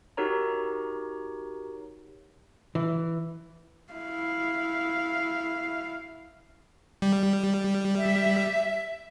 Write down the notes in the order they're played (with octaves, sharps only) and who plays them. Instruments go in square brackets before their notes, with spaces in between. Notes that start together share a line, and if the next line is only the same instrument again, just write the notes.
[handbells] D#4 F#4 G4 A#4 C#5 A#5
[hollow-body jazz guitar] E3
[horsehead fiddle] E4 F5
[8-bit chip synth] G3
[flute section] E5